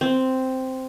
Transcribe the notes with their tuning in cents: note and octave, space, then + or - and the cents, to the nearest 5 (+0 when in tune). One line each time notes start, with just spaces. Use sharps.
C4 -5